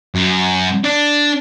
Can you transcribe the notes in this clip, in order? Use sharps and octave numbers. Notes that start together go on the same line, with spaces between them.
F#2
D4